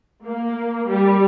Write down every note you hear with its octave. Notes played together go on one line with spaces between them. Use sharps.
A#3
G3